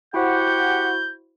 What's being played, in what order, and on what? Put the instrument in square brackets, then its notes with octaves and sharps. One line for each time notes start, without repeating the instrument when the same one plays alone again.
[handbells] E4 F#4 C5 [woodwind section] G4 F#5 [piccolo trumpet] G6